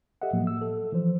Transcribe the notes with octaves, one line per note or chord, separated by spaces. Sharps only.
G4 A4 D#5 E5 F#5
A2 F3 F#3 A#3
E6
A4
E3 F3 C5